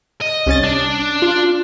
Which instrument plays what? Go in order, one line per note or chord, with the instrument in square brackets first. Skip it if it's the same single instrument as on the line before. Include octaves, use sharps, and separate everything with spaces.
[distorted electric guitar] D#5
[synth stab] C2 C#4 A6
[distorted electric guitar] D4
[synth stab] F4